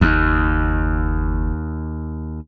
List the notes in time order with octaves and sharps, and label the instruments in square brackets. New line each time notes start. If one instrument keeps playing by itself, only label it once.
[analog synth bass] F#1 [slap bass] D#2